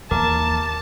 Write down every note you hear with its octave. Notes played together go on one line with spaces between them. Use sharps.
D#2 E3 A#3 A#4 A5 A#5 D6